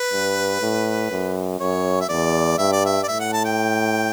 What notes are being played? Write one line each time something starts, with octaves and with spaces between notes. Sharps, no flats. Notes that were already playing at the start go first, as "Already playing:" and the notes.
Already playing: B4
G2
A2
F#2
F#2 C#5
E5
E2 D5
G2 E5
D5
E5
D5
A2 E5
F#5
A5
G5